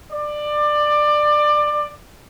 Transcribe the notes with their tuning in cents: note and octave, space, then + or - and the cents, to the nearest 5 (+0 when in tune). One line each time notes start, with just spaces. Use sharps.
D5 +20